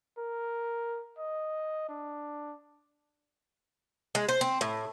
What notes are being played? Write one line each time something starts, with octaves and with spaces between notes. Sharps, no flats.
A#4
D#5
D4
G#3
C5
C4
A2